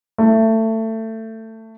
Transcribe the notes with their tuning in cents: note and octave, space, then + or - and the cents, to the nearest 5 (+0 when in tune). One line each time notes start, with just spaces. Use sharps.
A3 +20